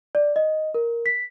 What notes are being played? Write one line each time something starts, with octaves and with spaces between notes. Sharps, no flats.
D5
D#5
A#4
B6